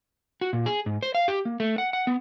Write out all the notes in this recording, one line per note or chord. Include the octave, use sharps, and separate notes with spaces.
F#4
A#2
G#4
G#2
C5
F5
G4
A#3
A3
F#5
F#5
B3